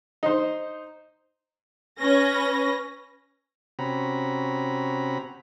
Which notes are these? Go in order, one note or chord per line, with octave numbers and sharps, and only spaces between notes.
D#4 C5
C#4 B4 A#6
C3 C4 C#4 F#4 A#5 B5